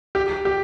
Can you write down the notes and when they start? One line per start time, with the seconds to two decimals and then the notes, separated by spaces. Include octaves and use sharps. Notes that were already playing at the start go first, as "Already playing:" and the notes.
0.15 G4
0.45 G4